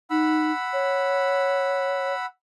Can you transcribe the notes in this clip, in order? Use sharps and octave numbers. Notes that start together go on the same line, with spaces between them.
D#4 F#5 B5 E6
C#5